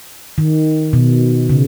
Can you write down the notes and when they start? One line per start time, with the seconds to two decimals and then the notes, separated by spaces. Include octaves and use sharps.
0.38 D#3
0.93 B2
1.50 C#3